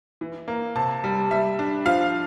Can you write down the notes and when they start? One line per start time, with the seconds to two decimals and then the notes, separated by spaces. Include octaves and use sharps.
0.21 E3
0.48 A#3
0.75 C3 A5
1.04 G3
1.31 G3 E5
1.59 D4
1.85 F3 F5